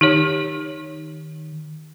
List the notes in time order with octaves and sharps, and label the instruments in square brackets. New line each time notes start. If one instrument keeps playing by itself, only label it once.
[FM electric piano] D#3 [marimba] D#4 G4 C#5